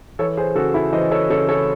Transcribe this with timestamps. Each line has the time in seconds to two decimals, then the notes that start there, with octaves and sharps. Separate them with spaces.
0.19 E3 A4 C#5
0.37 G#4 C5
0.56 C#3 F#4 A4
0.74 E4 G#4
0.93 E3 C5 D#5
1.11 A4 C#5
1.30 C#3 A4 C#5
1.49 A4 C#5